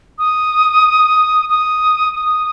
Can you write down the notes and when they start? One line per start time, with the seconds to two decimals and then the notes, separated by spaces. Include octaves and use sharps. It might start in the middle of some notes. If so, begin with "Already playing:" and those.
0.18 D#6
1.49 D#6
2.14 D#6